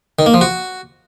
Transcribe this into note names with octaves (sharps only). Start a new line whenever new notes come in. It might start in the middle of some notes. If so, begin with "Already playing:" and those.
D#3
A#3
F3
F#4